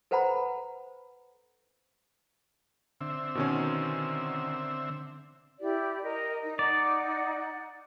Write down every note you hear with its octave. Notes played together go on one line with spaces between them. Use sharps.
A4 B4 C5 F#5 A#5 B5
D3 C4 E5
B2 D#3 C#4
E4 G4 D5
A#4 D#5
D#4
D#4 D5 F#5